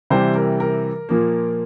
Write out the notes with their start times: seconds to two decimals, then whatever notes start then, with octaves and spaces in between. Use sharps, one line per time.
0.10 C3 E3 G3 C5
0.35 A#4
0.60 A#4
1.09 A#2 F3 A#3